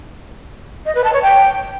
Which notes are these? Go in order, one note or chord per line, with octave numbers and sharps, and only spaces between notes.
D#5
B4
A5
C#5
G5